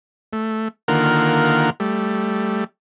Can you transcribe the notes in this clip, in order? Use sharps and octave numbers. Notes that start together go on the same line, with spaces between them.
A3
D3 D#3 A#3 F4 A#4 F#5
G3 A3